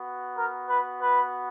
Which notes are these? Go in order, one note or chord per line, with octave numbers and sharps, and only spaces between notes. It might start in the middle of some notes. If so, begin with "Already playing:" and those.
Already playing: B3 F#4
A#4
B4
B4